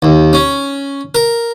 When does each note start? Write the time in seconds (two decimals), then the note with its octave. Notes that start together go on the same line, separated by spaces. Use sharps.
0.02 D#2
0.33 C#4
1.15 A#4